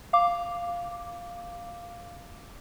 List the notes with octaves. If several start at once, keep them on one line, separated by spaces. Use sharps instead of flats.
F5 D6